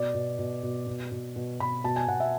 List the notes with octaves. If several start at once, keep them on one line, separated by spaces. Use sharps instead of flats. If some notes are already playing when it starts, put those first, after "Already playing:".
Already playing: B2 D5
B2
B2
B2
B2
B2
B2
B2 B5
B2 A5
G#5
B2 F#5
E5